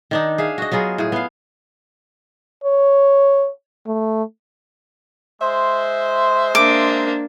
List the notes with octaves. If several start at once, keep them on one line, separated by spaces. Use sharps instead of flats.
D#3 D4 D#4
G#4 E5 F5
F#4 D#5
F#3 B3 F4 G#4
A2 G#4
B3 F5
C#5
A3
G#3 C5 E5 C6
A#3 D4 D6